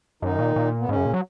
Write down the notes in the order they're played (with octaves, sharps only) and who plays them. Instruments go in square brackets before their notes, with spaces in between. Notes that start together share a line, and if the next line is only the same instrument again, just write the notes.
[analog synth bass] F#2 [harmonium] D#3 D#4
[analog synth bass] A#2
A#2
[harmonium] B3
[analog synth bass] G#2 [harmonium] C#3 C#4
[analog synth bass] F#2
A#2
F#3